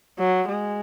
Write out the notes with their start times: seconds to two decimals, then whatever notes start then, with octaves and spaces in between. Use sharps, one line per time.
0.19 F#3
0.48 G#3